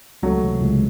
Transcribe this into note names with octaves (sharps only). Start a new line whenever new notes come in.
C#2 F#3 A3
C3 E3
C#2